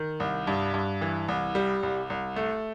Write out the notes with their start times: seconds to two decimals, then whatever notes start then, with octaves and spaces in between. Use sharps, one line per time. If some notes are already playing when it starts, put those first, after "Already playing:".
Already playing: D#3
0.20 C2
0.47 G2
0.74 G2
1.01 E3
1.28 C2
1.55 G3
1.83 C2
2.10 C2
2.36 A3